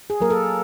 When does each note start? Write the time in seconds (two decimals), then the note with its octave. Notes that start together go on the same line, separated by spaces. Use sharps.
0.10 G#4
0.20 F#3 A#3 A#4
0.30 A4